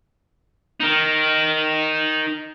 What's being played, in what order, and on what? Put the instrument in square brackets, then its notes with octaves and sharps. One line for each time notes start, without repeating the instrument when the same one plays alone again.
[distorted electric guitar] D#4 A#4